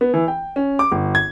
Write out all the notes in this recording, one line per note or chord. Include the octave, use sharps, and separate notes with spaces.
B3
E3
G5
C#4
D6
G1
G#6